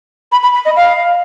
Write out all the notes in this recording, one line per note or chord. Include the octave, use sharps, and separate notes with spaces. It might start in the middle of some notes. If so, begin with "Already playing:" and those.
B5
B5
B5
D#5
F5